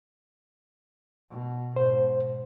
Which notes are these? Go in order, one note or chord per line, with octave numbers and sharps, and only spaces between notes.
B2
G#2 B2 C5